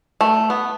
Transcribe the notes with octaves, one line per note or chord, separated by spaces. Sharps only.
A3
B3